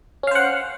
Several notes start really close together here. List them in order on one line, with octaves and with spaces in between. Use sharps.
C#4 F5 C5 F#5